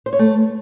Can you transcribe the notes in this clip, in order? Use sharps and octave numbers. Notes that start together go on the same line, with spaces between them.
C5
C#5
A3